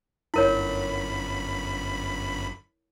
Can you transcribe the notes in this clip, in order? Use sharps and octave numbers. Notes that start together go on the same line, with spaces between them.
G1 F#2 E4 A#4 C#5 B5